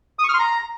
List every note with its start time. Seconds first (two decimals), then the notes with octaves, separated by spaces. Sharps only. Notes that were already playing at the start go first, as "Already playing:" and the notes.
0.19 D#6
0.24 C#6
0.29 F6
0.34 C6
0.39 A#5